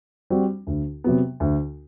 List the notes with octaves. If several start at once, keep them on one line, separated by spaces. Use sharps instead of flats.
G3 C4 F#4
D2
C3 F#3 B3
D2